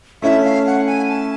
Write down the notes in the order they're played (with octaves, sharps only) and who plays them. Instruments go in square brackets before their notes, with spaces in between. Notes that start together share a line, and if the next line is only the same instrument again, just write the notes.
[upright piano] A3 C#4 E4 [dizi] E5
[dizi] F5
F#5
G#5
A5